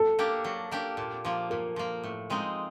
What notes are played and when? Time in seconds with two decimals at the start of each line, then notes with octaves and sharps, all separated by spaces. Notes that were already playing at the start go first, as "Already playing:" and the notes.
Already playing: A4
0.19 A#3 D4 G4
0.44 F#3
0.71 A#3 D4 G4
0.97 A#2
1.25 F3 A#3
1.50 A#2 A#4
1.76 F3 A#3
2.04 A2
2.30 F3 G#3 C4 D#4